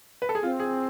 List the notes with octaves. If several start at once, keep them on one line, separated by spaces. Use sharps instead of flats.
B4
A4
G#4
C4 F4
G#4